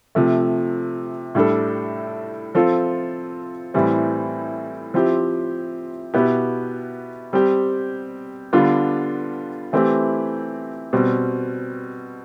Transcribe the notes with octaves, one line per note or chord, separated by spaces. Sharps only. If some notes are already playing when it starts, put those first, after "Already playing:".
C3 F3 A3
A2 G3 D4 A4
F3 C4 F4 A4
A2 E3 G3 C4
F3 C4 E4 G4
B2 B3 E4 G4
G3 C4 G4
D3 G3 B3 D4 F4
E3 A3 C4 E4 G4
B2 G3 C4